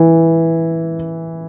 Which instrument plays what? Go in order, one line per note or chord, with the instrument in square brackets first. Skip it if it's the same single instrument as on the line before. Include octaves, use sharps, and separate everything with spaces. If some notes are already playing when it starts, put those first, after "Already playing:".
Already playing: [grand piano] E3